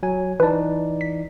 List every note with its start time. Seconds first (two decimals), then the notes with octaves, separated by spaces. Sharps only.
0.03 F#3 G#5
0.40 E3 D#4 B4 D5 A5
1.01 B6